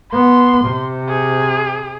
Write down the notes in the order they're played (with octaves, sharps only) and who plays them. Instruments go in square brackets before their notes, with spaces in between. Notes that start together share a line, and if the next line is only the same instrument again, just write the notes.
[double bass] B3 [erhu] C6
[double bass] C3
[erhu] G#4